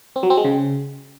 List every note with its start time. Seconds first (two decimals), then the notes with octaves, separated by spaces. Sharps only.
0.16 C4
0.23 F#3
0.30 C4
0.37 G#3
0.45 C#3